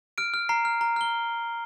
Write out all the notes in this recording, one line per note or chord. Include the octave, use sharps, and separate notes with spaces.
F6 D7
F6
A#5 C7
F6
A#5
F6 G7